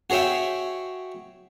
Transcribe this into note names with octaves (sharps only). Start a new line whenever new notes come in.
F#4 G#4 C#5 E5 G5